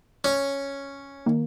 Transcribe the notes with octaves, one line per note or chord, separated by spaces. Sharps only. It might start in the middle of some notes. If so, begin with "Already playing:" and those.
C#4
D#3 A#3